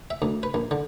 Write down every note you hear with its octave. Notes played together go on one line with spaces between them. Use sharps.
E5
D2
B4
A#1
D3